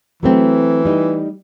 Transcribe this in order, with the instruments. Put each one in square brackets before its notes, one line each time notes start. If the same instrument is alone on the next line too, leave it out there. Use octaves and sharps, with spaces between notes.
[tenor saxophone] E3 [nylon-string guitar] F#3 A3 C4
[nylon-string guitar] G3 D#4